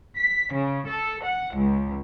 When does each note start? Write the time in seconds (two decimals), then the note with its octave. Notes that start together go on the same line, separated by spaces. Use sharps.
0.17 B6
0.53 C#3
0.88 A4
1.23 F#5
1.56 C#2